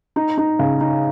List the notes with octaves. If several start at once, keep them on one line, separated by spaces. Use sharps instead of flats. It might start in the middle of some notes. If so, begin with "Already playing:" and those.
D#4
D#4
C#3
D#4